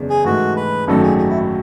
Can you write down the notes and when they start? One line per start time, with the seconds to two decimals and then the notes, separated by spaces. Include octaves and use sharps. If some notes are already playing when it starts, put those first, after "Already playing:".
Already playing: F#1 E2 C#3
0.10 G#4
0.24 G#2 E3 A3 F#4
0.56 B4
0.87 G#1 F#2 D#3 F#3 A3 A4
1.03 G#4
1.18 G#4
1.29 E4